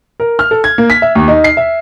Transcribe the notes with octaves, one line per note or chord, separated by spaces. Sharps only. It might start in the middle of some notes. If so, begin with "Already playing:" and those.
A#4
F6
A4
G#6
A#3
B6
E5
D#2
D#4
C7
E5